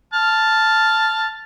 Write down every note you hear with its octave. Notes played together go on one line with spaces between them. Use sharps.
A5 F6